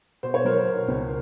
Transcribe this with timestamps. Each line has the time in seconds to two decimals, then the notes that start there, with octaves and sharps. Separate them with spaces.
0.23 B2 C5
0.34 C#5
0.45 F#3 A#4 C5
0.67 B2
0.88 C#2